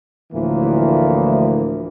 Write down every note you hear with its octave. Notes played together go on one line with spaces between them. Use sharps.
D2 A2 E3 F3 A#3 E4